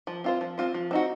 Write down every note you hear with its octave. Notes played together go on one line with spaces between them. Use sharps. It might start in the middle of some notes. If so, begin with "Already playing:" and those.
F3
C4 F4 C5
F3
C4 F4 C5
F3
C4 D#4 F#4